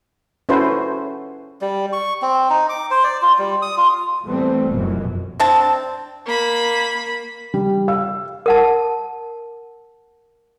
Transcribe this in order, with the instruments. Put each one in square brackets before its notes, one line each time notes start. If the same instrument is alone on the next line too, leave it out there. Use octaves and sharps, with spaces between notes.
[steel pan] C#4 E4 F#4 A4 B4 C5
[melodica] G3
C#6
C4
D#4
D6
C5
D5
F4
G3
D#6
F4
[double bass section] E3 G3 A3 B3 C4
F1 C2 F#2 B2 E3
[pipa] C4 D4 A5
[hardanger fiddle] A#3 B5
[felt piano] G3
F5 E6
[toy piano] A#4 F#5 A5